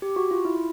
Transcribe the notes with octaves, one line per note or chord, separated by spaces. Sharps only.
G4
F#4
F4
E4